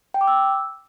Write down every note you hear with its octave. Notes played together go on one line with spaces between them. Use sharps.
G5
D6
E6